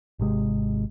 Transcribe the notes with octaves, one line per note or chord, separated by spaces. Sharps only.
G#1 C3 G#3